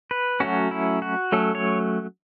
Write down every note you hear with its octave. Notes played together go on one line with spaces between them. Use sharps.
B4
F#3 A3 C#4 F#4
E4
F#4
F#3 A3 C#4 A4
C#5